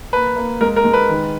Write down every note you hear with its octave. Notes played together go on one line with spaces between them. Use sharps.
A#3 B4
A#3
G#3 A#4
A#4
G#3
B4
D#3